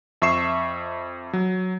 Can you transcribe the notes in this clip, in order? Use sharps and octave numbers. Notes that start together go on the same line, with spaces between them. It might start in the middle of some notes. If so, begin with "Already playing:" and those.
F2 E5 C#6 C7 E7
F#3